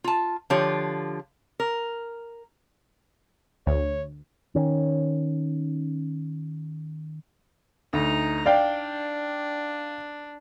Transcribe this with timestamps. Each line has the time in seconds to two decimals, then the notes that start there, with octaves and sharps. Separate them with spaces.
0.04 F4 A5
0.50 D3 F3 F4 G4 C#5
1.60 A#4
3.67 D2 C#5
4.55 D#3 C#4
7.93 D2 D#4 A#5
8.46 D4 D5 F5 G5